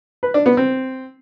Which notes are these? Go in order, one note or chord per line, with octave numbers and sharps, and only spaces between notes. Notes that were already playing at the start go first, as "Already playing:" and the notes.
B4
D4
B3
C4